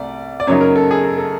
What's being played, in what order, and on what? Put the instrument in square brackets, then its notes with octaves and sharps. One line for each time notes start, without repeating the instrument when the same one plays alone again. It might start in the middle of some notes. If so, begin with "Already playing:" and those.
Already playing: [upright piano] C2 A3 D5
D5
F#2 C#3 F#3 A#3 D#4 C#5
A#4
A4
G#4
A4
A4